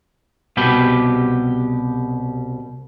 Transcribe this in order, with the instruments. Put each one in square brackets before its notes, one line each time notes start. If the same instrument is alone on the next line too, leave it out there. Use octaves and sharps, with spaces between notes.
[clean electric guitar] C2 B2 G4 B5